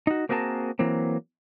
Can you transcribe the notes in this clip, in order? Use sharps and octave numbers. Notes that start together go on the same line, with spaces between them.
D#4 F#4
A#3 C4 F#4 G#4 A#4 A5
E3 F#3 A#3 C4